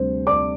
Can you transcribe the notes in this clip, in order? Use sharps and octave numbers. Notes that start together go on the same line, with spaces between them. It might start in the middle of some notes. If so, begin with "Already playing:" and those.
Already playing: D2 C3 G3 C5
D5 D6